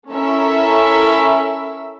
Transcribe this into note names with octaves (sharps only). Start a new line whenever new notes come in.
C#4 E4 A4 A#4 E5